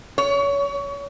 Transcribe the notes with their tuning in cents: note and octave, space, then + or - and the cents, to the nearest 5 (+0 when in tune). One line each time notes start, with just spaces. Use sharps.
C#5 +30